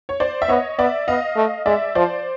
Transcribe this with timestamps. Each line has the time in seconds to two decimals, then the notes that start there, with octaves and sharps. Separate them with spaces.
0.09 C#5
0.20 C5 D5
0.42 E5
0.49 B3 C#5 D#5
0.79 B3 D5 E5
1.08 B3 D#5 F5
1.36 A3
1.66 G#3 D5 E5
1.95 F3 C5 D5